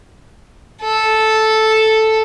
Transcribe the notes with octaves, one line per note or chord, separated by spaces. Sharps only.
A4